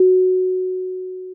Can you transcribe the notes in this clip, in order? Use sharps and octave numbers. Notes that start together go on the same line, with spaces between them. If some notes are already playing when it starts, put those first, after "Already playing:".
Already playing: F#4